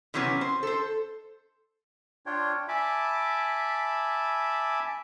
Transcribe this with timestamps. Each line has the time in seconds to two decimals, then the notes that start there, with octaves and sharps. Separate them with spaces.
0.14 C3 E3 F#3 B3 C#4
0.41 C5
0.63 A4 C5
2.26 D4 F4 C#5 G5
2.68 E5 G#5 A5 B5 D6